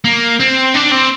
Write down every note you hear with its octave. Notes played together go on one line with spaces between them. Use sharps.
A#3
C4
D4
C4